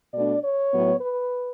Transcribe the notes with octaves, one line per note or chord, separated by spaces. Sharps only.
B2 A3 D4 D5
C#5
A2 F#3 B3
B4